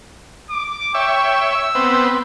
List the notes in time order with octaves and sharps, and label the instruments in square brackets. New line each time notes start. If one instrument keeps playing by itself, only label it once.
[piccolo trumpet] D6
[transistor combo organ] C#5 E5 [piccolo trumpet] G5
[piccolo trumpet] E6
[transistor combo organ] B3 C4